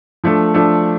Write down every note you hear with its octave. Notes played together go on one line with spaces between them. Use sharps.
F3 A3 D4 A4
F3 A3 D4 A4